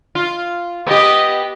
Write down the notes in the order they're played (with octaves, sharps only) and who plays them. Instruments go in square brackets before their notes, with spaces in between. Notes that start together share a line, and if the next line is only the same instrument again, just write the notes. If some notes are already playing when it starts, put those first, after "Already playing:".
[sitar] F4
[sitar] B3 G4 [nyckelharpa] D#5